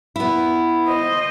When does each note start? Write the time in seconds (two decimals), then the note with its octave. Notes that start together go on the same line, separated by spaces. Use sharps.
0.16 B3 E4
0.88 C5 D#5